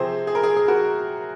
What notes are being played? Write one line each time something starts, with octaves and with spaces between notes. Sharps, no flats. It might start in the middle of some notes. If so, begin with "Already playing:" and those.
Already playing: C3 F3 C4 G#4 C5
G#4
A#4
G#4
G#4
F#4 A#4